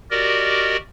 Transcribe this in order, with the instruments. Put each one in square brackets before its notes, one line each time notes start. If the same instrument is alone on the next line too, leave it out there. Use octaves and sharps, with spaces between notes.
[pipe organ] F#4 G4 A#4 D5 D#5